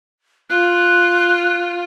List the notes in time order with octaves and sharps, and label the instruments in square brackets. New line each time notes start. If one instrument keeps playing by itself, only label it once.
[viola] F4 [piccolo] F#6